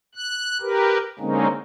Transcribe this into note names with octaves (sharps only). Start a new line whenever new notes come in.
F#6
G4 A#4 B4
D3 G#3 A#3 C4 C#4 D#4